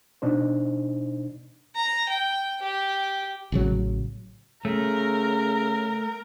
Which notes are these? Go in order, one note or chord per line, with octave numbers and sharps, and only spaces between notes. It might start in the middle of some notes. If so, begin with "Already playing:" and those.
B2 D4 D#4 C5
A#5
G5
G4
A1 C#3 F#3
C#3 A3 A#4